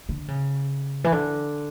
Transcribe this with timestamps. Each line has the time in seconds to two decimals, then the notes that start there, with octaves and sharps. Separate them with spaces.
0.09 D3
0.28 C#3
1.04 E3
1.12 D3